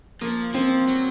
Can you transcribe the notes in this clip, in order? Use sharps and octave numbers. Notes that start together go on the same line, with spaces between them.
F3 A#3
F3 C4
F#3